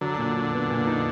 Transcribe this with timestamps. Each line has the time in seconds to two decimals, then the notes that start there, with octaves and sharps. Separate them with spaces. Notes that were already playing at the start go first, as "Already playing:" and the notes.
0.01 D3 F#3
0.18 A#2
0.35 F#3
0.53 B3
0.70 A#2
0.87 D#4